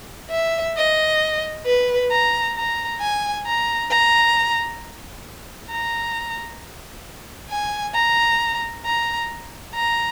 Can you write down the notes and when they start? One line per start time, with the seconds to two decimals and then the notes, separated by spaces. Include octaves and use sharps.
0.31 E5
0.77 D#5
1.66 B4
2.11 A#5
2.56 A#5
3.00 G#5
3.46 A#5
3.91 A#5
5.71 A#5
7.50 G#5
7.94 A#5
8.85 A#5
9.74 A#5